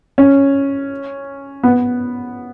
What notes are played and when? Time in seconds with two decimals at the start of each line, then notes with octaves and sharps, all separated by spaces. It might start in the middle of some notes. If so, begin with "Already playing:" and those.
0.18 C#4
1.63 B3